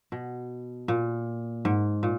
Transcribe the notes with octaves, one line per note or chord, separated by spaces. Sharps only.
B2
A#2
G#2
A#2